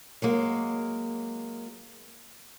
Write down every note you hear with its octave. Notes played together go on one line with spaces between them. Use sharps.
F#3 G#3 A#3